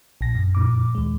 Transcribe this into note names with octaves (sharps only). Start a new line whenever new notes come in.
A#1 A#6
F#2
F2 A#2 D6
D#2 G#3